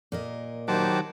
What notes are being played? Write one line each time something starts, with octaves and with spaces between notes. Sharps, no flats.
A#2 A#4 D#5
D#3 F#3 G4 C5 A5 D6